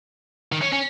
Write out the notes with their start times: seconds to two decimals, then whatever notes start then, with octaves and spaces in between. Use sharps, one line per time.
0.52 D#3
0.62 C#4
0.73 C#4